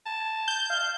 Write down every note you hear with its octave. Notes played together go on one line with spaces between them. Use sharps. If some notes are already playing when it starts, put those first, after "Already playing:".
A5
G6
F5